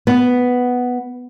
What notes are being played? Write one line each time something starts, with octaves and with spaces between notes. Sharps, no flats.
B3